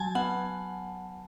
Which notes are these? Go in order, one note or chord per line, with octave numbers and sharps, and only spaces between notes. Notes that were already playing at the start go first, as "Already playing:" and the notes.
Already playing: F#3 G#5 A5
B3 F#5